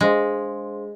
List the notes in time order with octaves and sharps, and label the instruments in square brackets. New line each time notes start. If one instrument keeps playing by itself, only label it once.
[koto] G#3 [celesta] D4 G#4 C5 F5 C6